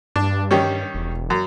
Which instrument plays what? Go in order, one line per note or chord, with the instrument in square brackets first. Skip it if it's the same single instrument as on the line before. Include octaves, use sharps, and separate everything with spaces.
[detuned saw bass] G2 [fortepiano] D4
[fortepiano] D#3 G3 C#4
[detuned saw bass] E1
[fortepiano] F#2